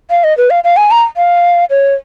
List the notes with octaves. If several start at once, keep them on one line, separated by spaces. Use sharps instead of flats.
F5
D#5
B4
F5
F5
G#5
A#5
F5
C#5